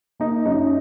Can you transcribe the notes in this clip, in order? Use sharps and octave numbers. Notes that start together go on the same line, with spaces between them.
A#3 D#4
F#2 D#4